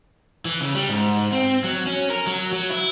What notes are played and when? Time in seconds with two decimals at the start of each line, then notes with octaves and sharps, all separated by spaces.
0.45 E3
0.61 C#3
0.75 G3
0.89 G#2
1.32 C4
1.64 F#3
1.86 C#4
2.10 A#4
2.27 F#3
2.52 F#3
2.70 E4